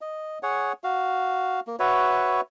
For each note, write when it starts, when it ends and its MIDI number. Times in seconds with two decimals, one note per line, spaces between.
0.01 0.39 75
0.43 0.73 68
0.43 0.73 73
0.43 0.73 78
0.84 1.60 66
0.84 1.60 77
1.67 1.76 58
1.79 2.41 66
1.79 2.41 71
1.79 2.41 73
1.79 2.41 76